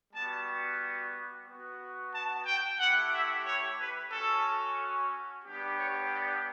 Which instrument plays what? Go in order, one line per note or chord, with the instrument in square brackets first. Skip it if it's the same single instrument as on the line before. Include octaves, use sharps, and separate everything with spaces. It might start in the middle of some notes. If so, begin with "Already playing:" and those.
[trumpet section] G3 B3 F#4 A5
B3 F#4
A5
G5
A3 E4 G4 F#5
E5
C#5
B4
C#4 F#4 A4
G3 B3 D4 G4
C#5
D5